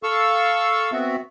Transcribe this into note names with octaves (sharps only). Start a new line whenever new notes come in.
A4 F5 C#6 E6
B3 C4 F#4 E5